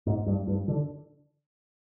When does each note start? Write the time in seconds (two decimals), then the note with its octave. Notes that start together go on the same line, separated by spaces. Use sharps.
0.06 G#2
0.26 G2
0.47 G2
0.68 D3